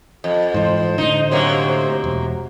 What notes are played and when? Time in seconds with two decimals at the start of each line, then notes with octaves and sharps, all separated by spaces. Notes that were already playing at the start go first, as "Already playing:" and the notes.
0.24 F2
0.54 G#2 E3 C5
0.98 A2 D3 D#4
1.31 C3 F#3 A#3
2.04 E1